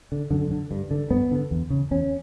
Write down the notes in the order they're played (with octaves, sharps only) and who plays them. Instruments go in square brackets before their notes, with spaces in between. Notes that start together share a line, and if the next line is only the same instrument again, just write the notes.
[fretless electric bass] D3
F#2 D3
D3
G2
D3
G2 B3
D3
E2
C#3
E2 C#4